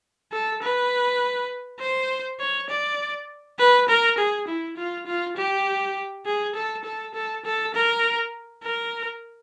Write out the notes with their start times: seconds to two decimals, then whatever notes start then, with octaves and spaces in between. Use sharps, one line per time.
0.32 A4
0.62 B4
1.80 C5
2.40 C#5
2.69 D5
3.59 B4
3.88 A#4
4.18 G#4
4.47 E4
4.77 F4
5.06 F4
5.36 G4
6.26 G#4
6.55 A4
6.84 A4
7.14 A4
7.45 A4
7.74 A#4
8.63 A#4